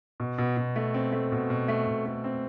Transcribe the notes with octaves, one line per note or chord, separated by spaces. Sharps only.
B2
B2
B2
A3
C4
A3
B2
B2
A3
B2
A3
C4